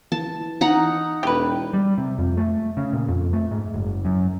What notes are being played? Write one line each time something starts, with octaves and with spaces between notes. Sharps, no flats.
E3 A5
D#4 F#5 A#5
E1 G4 B4
G3
C3
F2
A3
C#3
A#2
F2
A3
G#2
F#1
F#2